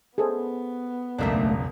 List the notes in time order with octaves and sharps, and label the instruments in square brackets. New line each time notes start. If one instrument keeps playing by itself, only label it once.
[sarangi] B3 [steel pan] G#4 A4 C5
[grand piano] E1 C#2 F#2 [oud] A3 A#3 D4